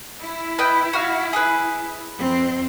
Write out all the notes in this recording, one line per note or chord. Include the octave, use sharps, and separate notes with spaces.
E4
B4 D#5 G5
F#4 F5
G#4 B4
F2 C4